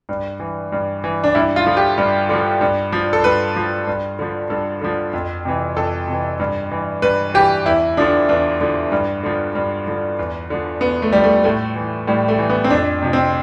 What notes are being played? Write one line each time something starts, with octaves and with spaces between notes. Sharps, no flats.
G2
E3
G2
E3
D4
G2 E4
F4
D3 F3
G4
G2
D3 F3
G2
F3
A4
G2 B4
F3
G2
D3 F3
G2 A4
D3 F3
F2
C3 E3
F2 A4
C3 E3
G2
E3
G2 B4
E3 G4
E2 E4
D3 F3 D4
E2 D4
D3 F3
G2
D3 F3
G2
D3 F3
E2
D3 F3
E2 B3
A3
D3 F3 G3
A3
A2 A3
E3
A2 G3
A3
E3
B3
C4
F2 D4
C3 F3
C4